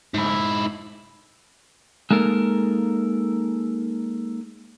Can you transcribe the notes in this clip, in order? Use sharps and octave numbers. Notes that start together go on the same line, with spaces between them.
G#2 E4
G#3 A#3 D#4 A4 A#4